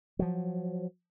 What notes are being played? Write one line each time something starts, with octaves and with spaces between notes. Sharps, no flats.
F3 F#3